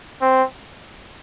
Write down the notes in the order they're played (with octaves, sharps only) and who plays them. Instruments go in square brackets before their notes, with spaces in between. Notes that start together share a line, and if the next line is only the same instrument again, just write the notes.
[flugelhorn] C4